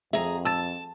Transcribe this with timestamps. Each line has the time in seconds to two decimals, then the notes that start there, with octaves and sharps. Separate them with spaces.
0.13 F2 G#4 E5 A#5
0.45 A5 E6 A6